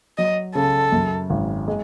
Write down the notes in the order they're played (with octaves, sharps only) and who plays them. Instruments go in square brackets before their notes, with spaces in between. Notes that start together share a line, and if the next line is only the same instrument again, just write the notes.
[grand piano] F#3 [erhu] D#5
[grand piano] C#3 [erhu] A4
[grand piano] F#2
G#1
G#3